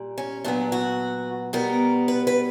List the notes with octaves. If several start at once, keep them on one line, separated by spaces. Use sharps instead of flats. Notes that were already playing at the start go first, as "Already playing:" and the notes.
Already playing: A#2 G3
C#4
A#2 F#3 B3 D4
F#4
B2 G3 B3 A#4
B4
B4